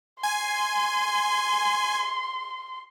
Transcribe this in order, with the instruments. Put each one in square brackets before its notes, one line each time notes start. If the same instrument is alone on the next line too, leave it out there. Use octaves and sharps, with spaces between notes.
[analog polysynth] G#5 [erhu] C6